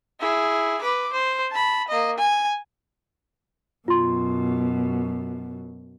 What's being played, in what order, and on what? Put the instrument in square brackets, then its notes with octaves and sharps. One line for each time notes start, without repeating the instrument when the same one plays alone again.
[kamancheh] E4 G#4
B4 D6
C5
A5 B5
A#3 D#5
G#5
[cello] F#2 B2 [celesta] F4 C6